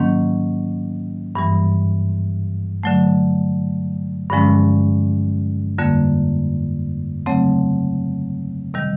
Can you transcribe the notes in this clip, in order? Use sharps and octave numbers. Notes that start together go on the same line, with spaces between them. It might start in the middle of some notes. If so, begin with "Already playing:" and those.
Already playing: G#2 D#3 F#3 A#3 C#4
G2 E3 G3
D3 F#3 A3
G2 D3 F3 G#3 C#4
F2 D3 G3 A#3
C#3 F#3 A3 C4
C3 D#3 G3